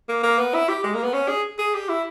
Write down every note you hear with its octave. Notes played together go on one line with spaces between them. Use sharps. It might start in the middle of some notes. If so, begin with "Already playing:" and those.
A#3
A#3
B3
E4
G4
G#3
A#3
B3
C#4
G#4
G#4
G4
E4